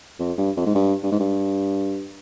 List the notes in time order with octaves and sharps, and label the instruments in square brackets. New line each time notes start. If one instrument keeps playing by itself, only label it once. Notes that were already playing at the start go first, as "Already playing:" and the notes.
[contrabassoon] F2
G2
F2
G#2
G2
G2
G#2
G2